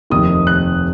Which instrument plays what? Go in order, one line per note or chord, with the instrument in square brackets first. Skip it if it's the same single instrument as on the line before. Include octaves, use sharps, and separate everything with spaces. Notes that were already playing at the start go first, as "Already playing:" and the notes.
[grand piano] F1 D#2 D#3 D#6
F#6